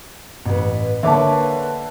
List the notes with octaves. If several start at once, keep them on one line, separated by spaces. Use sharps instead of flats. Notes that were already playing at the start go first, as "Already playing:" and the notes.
A1 B4
D3 A#3 B4 C#5 E5 A5 D6